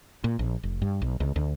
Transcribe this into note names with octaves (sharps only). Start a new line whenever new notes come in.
A#2
A#1
F1
G2
B1
C#2
D2